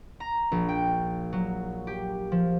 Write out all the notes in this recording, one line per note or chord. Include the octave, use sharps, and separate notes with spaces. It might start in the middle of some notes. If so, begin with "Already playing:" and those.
A#5
A#1
G5
F#3
G4
F3